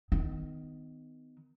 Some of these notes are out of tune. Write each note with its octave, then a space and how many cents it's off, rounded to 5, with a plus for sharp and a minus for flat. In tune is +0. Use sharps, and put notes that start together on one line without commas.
D#3 +0 B3 +40